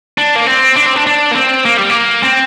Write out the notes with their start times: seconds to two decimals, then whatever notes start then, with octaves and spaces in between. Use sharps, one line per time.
0.18 D4
0.36 A#3
0.47 C4
0.77 D4
0.86 C4
0.96 D4
1.06 D4
1.31 A#3
1.35 C4
1.65 A#3
1.77 G3
1.90 A#3
2.24 C4